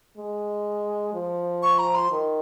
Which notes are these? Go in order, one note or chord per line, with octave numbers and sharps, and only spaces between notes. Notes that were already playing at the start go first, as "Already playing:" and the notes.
G#3
F3
C#6
A#5
C6
D#3